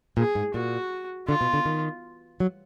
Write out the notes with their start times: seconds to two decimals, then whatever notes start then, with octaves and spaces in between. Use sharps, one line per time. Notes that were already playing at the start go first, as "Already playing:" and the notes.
0.17 A#2 G#4
0.35 G#2
0.54 A#2 F#4
1.28 D3 F4
1.41 B2
1.53 D3
1.66 D#3
2.40 F#3